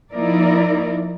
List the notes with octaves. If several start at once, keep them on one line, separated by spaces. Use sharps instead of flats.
F3 A#3 D#4 E4 A#4 D5